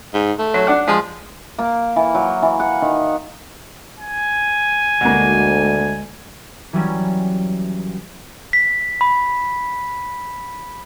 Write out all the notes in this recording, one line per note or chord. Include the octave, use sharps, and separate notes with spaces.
G#2
A3
F#3
D4 D5 F#5
F3 G#3
A#3
E3
F#3
E3
F#5
D#3
G#5
D2 B2 G#3 A#3
E3 F#3 G3 C#4
B6
B5